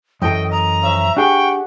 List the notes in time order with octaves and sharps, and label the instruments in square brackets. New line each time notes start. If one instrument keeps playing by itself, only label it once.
[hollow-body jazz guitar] F#2 E3 A4 [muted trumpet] D#5 [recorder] G5
[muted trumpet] D#5 [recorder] A#5
[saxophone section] F3 C#4 E5
[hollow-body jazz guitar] D4 G#4 [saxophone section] G4 F#5 [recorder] G5 [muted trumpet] C#6